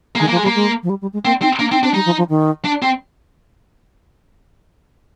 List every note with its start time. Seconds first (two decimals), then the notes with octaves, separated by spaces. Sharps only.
0.15 A#3
0.19 D#3 G#3
0.28 F3 A#3
0.37 G#3
0.43 G3
0.46 A#3
0.55 G#3
0.83 F3
0.89 G3
1.02 G3
1.13 G#3
1.25 A#3 C4
1.42 C4 D#4
1.59 A#3 D4
1.71 C4 D#4
1.83 C4 D4
1.94 G3 D#4
2.05 F3
2.18 F3
2.29 D#3
2.65 D4
2.82 C4